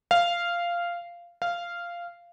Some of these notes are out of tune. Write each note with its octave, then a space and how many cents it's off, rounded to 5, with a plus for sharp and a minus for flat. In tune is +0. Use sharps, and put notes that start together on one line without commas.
F5 -10
F5 -10